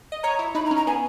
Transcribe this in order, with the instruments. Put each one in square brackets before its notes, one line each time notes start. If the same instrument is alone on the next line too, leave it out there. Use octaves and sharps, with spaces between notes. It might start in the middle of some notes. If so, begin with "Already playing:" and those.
[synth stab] D#5
[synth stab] C#5 [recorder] A#5
[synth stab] E4
[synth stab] D#4 [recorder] B5
[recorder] A#5
[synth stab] C#4
[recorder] A#5
[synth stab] B3 [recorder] G#5